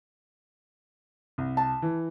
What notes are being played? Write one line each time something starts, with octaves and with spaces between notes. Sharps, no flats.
C2
A5
E3